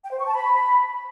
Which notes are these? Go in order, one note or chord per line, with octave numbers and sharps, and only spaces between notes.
G5
C5
C#6
A5
B5